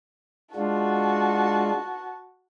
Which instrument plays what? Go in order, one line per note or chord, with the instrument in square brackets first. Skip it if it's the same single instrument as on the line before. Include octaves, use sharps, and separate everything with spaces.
[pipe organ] G#3 D4 F4 [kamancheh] F#4 A5